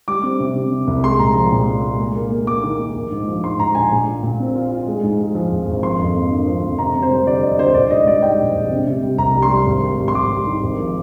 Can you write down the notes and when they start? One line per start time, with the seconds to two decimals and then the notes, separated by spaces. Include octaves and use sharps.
0.08 G3 D6
0.23 C4
0.40 C3
0.55 C3
0.71 C3
0.87 C2
1.04 G#3 C6
1.19 A#2 A#5
1.35 F3
1.52 A#2
1.67 A#2
1.83 G#3
2.00 A#3
2.15 A#3
2.31 A#3
2.47 A#3 D6
2.63 D#3
2.79 A#3
2.95 A#1
3.11 G#2
3.28 F3
3.44 G#2 C6
3.59 G#2 A#5
3.75 A#1 G#5
3.92 A#2
4.07 F4
4.23 A#2
4.40 C4
4.55 F4
4.71 F4
4.87 G#3
5.03 G#2
5.19 G#3
5.35 F3
5.51 G#1
5.68 G#1
5.82 F3 C6
5.99 F2
6.15 A#3
6.31 D3
6.47 F3
6.64 F2
6.79 C3 A#5
6.96 C3
7.02 C5
7.11 G3
7.27 D2 D5
7.42 D2 D#5
7.59 C3 C5
7.74 A#1 D5
7.90 G#2 D#5
8.07 G3 D5
8.22 G#2 G5
8.39 A#1
8.55 A#1
8.71 C3
8.87 C3
9.03 G3
9.18 C2 A#5
9.35 G3
9.42 C6
9.51 G3
9.66 G#1
9.83 G3
9.98 G3
10.08 C6
10.15 G#1 D6
10.30 G3
10.47 D#3
10.63 G#1
10.79 F3